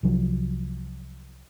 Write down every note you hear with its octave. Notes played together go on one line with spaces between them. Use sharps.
C2 F3 F#3